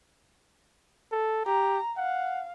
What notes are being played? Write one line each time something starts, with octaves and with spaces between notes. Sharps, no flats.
A4
G4 A#5
F5 F#5